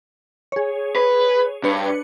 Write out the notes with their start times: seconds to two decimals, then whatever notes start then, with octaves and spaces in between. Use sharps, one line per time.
0.52 G#4 C#5
0.96 B4
1.63 G2 D4 B4 C#7